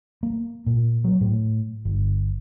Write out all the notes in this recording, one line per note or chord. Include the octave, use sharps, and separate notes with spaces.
A#3
A#2
F#3
A2
G1